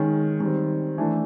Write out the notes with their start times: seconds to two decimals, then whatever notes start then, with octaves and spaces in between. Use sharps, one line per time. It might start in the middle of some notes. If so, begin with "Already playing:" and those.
Already playing: D#3 G#3 C#4
0.40 D#3 G3 C4
0.98 E3 A3 D4